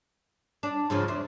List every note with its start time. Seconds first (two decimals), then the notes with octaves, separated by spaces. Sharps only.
0.63 D4
0.90 G#2 C#3 F3
1.08 E2 C4